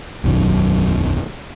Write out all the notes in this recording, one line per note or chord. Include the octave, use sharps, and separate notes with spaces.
E1 B1 F#2 D#3